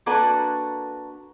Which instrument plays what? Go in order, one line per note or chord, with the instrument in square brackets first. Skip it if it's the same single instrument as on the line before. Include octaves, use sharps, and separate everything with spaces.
[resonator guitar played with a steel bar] A#3 D4 F#4 A4 B4